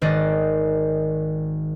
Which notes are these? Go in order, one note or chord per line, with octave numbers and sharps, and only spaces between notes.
G#1 D#3 D5 D#5 F#6 A6